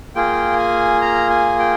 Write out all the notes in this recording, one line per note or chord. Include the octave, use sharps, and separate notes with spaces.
A#3 F4 G#4 G5
G#5
A#5
G#5
G5